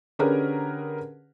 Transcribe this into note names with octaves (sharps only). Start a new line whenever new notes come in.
D3 C#4 G4 G#4 A#4 B4